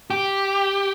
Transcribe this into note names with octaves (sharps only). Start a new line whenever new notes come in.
G4